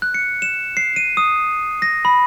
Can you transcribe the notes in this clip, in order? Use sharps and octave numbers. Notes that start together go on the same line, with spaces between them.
F#6
C#7
E7
C7
D#7
D#6
A#6
B5